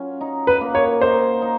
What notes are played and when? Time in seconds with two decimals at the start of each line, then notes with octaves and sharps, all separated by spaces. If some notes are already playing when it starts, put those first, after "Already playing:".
Already playing: F#3 C#4 F4
0.21 D#4
0.47 B4
0.61 A#3
0.75 C#5
1.01 D#4 C5
1.42 D#4